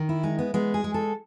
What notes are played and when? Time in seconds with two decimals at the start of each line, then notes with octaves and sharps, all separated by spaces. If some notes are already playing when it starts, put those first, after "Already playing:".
Already playing: D#3
0.09 E4
0.23 G#3 D#4
0.39 B3
0.54 G#3 B3
0.74 G#4
0.84 G#3
0.94 A4